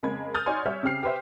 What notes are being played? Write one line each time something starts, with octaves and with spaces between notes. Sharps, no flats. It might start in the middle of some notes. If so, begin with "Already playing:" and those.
F2 C#3 G#3 A#3 B5 G#6
D#6 F6 G6 A6
D#4 F#4 C#5 D5 G#5 C6
G3 C#5 E5 F6 G6
C#3 C4 G4 F6 C7
G4 B4 C5 E5